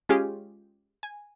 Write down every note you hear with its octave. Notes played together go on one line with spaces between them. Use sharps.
G#3 C#4 F4 G4 G#4
G#5